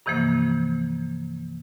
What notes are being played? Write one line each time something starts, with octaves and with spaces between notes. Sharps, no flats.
G2 C3 E3 F3 A#3